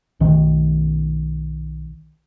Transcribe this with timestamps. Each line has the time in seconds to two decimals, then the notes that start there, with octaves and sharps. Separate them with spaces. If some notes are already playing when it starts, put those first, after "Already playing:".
0.20 B1 D#3